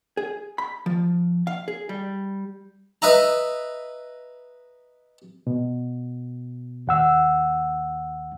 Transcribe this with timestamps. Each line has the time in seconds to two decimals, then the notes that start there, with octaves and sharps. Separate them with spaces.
0.17 G#4
0.58 B5
0.86 F3
1.47 F5
1.68 G#4
1.89 G3
3.02 B4 D#5 E5 A#5
5.47 B2
6.87 D#2 F#5 E6